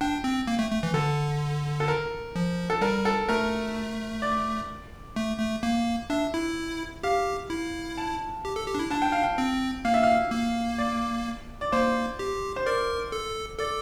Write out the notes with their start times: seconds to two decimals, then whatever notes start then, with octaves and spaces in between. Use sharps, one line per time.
0.01 D4 G5
0.24 C4
0.47 A#3
0.59 A3
0.71 A3
0.83 E3
0.94 D3 A4
1.80 A4
1.88 A#4
2.36 F3
2.70 A4
2.81 G3 A#4
3.05 A4
3.28 A3 A#4
4.22 D5
5.16 A3
5.39 A3
5.63 A#3
6.10 D4 E5
6.34 E4
7.03 G4 F5
7.50 E4
7.98 A5
8.45 G4
8.56 A4
8.67 G4
8.75 D4
8.79 E4
8.91 D4 A5
9.02 G5
9.12 F5
9.23 G5
9.38 C4
9.85 A#3 F5
9.94 E5
10.03 F5
10.32 A#3
10.78 D5
11.61 D5
11.72 A#3 C5
12.19 G4
12.56 C5
12.66 A#4 D5
13.12 A4
13.59 A4 D5